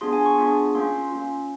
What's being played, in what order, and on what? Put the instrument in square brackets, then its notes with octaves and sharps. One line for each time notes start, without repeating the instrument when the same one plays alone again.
[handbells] B3 D4 F4 G#4 C6
G#5
C#6
B3 D4 F4 G#4 C#6
A#3 C#4 F4 C6
A#3 C#4 F4